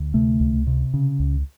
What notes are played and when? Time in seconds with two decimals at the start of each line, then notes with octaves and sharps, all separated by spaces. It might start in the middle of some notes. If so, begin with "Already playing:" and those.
Already playing: D2
0.14 C3 A3
0.40 C#2
0.67 C3
0.94 C#3
1.19 C#2